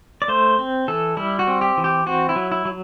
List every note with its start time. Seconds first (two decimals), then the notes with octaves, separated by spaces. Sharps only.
0.22 D5
0.28 A3 C5
0.59 C4
0.88 E3 A4
1.17 G3 E4
1.39 F#4
1.47 C4
1.61 G4
1.77 E3
1.84 G4
2.06 C4 F#4
2.29 E4
2.36 F#3
2.52 E4
2.65 F#3